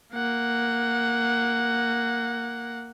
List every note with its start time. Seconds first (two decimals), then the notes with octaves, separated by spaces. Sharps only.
0.13 A#3 F#5